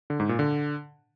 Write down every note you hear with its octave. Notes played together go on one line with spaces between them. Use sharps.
D3
G#2
A#2
D3